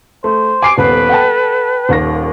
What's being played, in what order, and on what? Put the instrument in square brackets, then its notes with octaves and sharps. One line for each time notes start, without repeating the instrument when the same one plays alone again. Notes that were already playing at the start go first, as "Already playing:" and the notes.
[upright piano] A3 [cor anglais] C5
[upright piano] G#5 C7 D7 [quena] D6
[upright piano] D#1 B3 [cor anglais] A4 [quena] B4
[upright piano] F#5 G5 A5
D#1 D#2 A#6